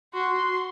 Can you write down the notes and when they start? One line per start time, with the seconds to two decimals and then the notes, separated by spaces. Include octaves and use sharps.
0.13 F#4 C6